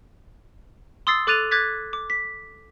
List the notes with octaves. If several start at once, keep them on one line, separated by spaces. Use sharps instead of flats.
C6 D#6 E6 A6 C7
A4 D6 F#6 A6 D#7 F7
D6 F#6 G#6 A6 B6
D6
B6